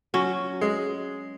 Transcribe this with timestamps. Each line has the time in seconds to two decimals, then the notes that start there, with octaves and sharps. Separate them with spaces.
0.14 F#3 C#4
0.61 G#3